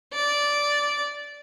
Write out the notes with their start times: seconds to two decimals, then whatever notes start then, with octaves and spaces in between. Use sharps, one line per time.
0.13 D5